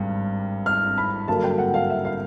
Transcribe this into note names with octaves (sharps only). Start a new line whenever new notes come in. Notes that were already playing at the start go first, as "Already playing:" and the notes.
Already playing: G#1 G2 G3
F6
B5
G2 D3 F#3 A#3 A5
G5
F#5
F5
E5
F5